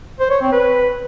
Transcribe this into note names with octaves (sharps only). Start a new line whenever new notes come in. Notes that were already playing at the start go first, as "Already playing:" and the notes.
C5
C#5
C4
B4